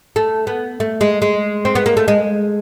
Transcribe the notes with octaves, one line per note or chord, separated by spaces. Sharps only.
A3
B3
A3
G#3
G#3
C4
B3
A#3
A3
G#3